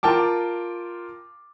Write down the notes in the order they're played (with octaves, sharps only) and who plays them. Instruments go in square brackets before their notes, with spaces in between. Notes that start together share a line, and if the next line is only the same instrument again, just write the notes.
[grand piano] F4 A#4 G5 A5 D6